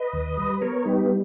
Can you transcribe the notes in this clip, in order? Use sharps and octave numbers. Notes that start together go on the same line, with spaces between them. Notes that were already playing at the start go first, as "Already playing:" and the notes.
Already playing: B4 D#5
D#2
G3
B4
B3 A#4 C#5
G3 D#4 G4